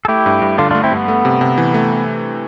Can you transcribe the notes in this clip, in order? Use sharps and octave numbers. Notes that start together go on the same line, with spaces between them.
A4
A3 E4 G4
G2
G2
D3 D4 F4
A3 D4 F4
C4 E4
G2 B3
A3
C3
C3
E3
A3